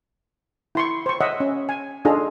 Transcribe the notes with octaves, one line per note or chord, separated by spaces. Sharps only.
E4 C6 C#6
C5 C#6
C#5 D#5 E5 F#5
C#4
G#5
D4 D#4 F4 G#4 A4 A#5